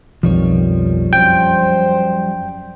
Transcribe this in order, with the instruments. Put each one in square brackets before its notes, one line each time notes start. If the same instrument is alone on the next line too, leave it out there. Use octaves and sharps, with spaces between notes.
[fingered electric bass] B1 F2 D#3 [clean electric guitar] F3 G3 C#5
[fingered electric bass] F#2 [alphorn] C5 [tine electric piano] G5